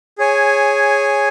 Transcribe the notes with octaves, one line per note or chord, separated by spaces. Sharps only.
G#4 C#5 G#5